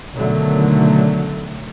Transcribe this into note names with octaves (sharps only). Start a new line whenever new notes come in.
B2 D3 D#3 F#3 A3